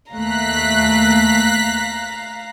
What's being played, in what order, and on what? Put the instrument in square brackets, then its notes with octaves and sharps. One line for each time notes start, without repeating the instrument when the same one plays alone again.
[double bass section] D#2 A#3 [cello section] A3 [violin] F5 A#5 [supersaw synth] F#6 B6